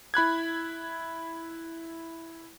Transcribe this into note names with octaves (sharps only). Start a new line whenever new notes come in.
E4 B5 F#6 G#6